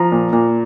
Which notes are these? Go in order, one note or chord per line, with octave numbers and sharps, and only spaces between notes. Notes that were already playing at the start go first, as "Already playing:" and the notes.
Already playing: F3 A#5
A#2
A#2